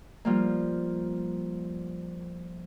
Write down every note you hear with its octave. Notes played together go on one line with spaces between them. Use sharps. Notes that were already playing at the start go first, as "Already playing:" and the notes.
F3 G3 A#3